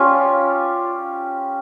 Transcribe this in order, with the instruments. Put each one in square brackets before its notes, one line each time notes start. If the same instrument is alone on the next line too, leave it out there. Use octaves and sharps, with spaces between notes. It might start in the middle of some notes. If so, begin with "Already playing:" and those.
Already playing: [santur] C#4 F4 G4